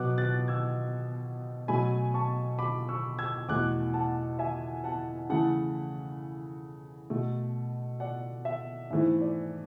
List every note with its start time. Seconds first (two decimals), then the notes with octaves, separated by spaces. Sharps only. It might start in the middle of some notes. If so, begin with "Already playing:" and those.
Already playing: B2 F#3 B3 D6 F#6
0.18 F#6 A6
0.48 E6 G#6
1.68 B2 F#3 A3 G#5 B5
2.14 A5 C#6
2.59 B5 D6
2.89 C#6 E6
3.19 E6 G#6
3.49 E2 B2 A3 D6 F#6
3.94 F#5 A5
4.39 E5 G#5
4.84 F#5 A5
5.29 C#3 E3 A3 F#5 A5
7.10 B2 A3
8.00 D5 F#5
8.45 E5
8.90 G#2 E3 A3 E5
9.21 D5